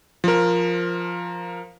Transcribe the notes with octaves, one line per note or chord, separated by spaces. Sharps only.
F3 A#4